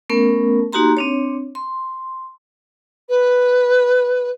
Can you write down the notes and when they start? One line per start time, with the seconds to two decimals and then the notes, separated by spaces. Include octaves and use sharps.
0.09 A3 B3 C#4 A#4
0.72 A#3 D#4 F#4 G4 A#5 C6
0.97 C4 D4 C#5
1.55 C6
3.09 B4